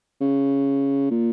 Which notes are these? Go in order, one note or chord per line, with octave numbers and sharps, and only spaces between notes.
C#3
A#2